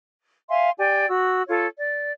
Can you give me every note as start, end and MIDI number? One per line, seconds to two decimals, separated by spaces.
0.49 0.70 76
0.49 0.70 77
0.49 0.70 80
0.49 0.70 84
0.78 1.06 67
0.78 1.06 74
0.78 1.06 79
0.78 1.06 80
1.08 1.41 66
1.08 1.41 88
1.48 1.68 65
1.48 1.68 69
1.48 1.68 73
1.79 2.13 74